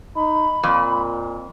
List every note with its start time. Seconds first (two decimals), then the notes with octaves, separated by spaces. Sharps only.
0.16 D#4 B5
0.63 F2 A#2